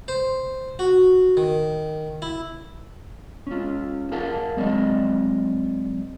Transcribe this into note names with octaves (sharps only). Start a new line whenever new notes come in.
C5
F#4
D#3
E4
C#4 F4
G#4 A#4 F5 F#5 A5
F#3 G#3 C4 D5 D#5